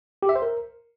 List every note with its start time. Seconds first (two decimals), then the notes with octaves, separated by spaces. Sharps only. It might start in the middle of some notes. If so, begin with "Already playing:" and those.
0.23 G4
0.29 E5
0.36 C5
0.42 A#4